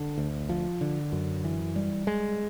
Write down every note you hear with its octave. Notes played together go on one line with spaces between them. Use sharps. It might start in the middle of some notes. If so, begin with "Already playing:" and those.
Already playing: D3
D2
F3
D3
F#2
E3
G3
G#3